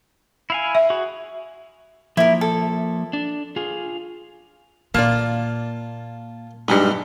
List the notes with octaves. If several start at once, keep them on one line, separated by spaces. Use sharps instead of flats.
E4 F5 G#5
E5
F#4 G#4
F3 A#3 E4 A#4
A4
D4
F4 G#4
A#2 A#3 F4 D5 A5
B1 G2 G#3 E4 G4